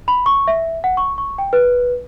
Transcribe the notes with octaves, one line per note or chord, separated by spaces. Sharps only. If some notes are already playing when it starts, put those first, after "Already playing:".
B5
C#6
E5
F#5
C#6
C#6
G5
B4